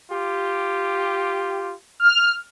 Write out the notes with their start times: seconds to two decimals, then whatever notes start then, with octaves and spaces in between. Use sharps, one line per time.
0.11 F4 G4
2.00 F6